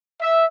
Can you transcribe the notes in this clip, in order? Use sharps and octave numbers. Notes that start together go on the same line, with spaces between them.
E5